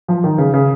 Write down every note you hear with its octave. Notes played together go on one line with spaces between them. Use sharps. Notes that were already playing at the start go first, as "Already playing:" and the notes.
F3
D#3
C#3
C#3